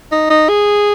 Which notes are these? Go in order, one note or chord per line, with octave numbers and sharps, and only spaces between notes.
D#4
D#4
G#4